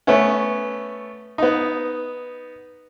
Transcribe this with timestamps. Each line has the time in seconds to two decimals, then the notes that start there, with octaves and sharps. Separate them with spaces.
0.07 A3 B3 C#4
1.38 B3 D#4